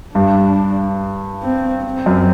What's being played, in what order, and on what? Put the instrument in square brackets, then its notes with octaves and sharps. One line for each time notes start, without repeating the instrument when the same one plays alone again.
[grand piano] G2 [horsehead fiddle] D4
[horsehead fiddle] C4
C4
[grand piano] F#2